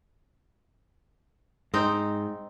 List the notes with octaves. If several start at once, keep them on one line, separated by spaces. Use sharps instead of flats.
G#2 C4 D#4 G5